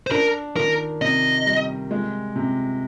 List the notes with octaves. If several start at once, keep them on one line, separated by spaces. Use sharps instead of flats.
C5
D4 A#4
D#3 A#4
C3 D#5
G3
G#3
C3